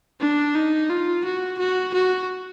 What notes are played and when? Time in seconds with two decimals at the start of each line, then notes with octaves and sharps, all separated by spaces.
0.21 D4
0.55 D#4
0.90 F4
1.25 F#4
1.59 F#4
1.94 F#4